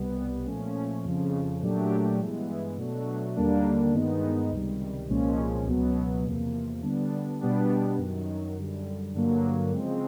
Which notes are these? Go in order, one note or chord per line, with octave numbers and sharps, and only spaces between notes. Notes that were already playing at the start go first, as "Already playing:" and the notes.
Already playing: C2 B2 G3 B3
A#2 F3 A3 C#4
F2 C#3 F3
A#2 F#3 A3 D4 G4
G2 E3 G#3 B3 E4
B2 F#3 A3 D4 F#4
D#2 D3 G3 A#3 D4
G2 D#3 G#3 B3 D#4
C#2 C3 D#3 G3
C2 A#2 F3 G#3 C#4
C#2 B2 F#3 B3
E2 C3 F3 A#3
D3 G3 B3 D4
B2 G3 B3 D4 G4
F#2 D#3 F#3
F#2 D3 G3
G2 D3 F#3 A#3
C#3 F3 G#3 C4